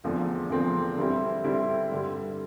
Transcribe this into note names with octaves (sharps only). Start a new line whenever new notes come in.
E2 D3 F3 A3 C4
E2 D3 F3 A3 C4
D3 G3 C4 E4
D3 G3 C4 E4
G2 D3 G3